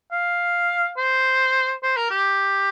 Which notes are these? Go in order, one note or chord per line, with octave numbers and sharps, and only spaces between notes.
F5
C5
C5
A#4
G4